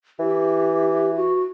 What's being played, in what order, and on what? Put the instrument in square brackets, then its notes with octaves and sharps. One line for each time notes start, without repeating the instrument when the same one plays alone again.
[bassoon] E3 [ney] G4
[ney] F#4